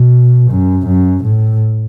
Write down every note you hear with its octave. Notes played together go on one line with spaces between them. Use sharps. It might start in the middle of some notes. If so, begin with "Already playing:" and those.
Already playing: B2
F#2
F#2
A2